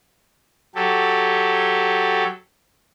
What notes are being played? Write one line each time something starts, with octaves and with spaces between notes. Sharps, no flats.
F#3 G4 A4